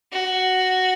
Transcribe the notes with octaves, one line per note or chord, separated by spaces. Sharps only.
F#4